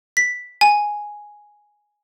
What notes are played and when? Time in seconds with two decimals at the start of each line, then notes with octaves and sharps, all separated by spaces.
0.17 B6
0.61 G#5